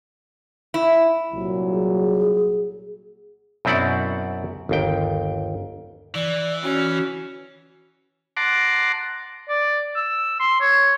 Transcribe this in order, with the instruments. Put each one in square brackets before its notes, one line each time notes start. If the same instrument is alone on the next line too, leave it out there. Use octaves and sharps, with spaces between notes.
[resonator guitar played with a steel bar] E4
[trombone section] C2 A#2 F#3
[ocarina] G#4
[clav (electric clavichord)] F#2 B2 C4 E4 D5 F#5
G1 D#2 G5
[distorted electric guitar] E3 [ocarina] D5
[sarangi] C#4 [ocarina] F#4
[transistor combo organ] F#5 A5 A#5 C6 D6
[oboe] D5
E6
C6
C#5